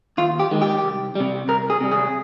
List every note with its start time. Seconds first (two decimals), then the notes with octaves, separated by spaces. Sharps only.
0.18 D#2 F4
0.39 G4
0.51 D#3 G#3
0.62 G4
0.84 C2
1.15 C3 G3
1.48 C2 A#4
1.70 G#4
1.81 C3 G3
1.91 G#4